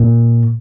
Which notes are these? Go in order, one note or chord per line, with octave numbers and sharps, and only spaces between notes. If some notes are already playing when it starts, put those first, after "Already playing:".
Already playing: A#2